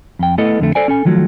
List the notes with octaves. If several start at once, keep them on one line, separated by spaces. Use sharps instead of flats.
F2 G5
A3 B3 E4 A4 D#5
F2 D3 A3
A4 C5 D5 G#5
C#4 A4 G#5
D#3 F3 F#3 A3